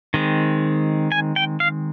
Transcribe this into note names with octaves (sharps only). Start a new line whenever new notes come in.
D#3 G#3 C4
G#5
G5
F5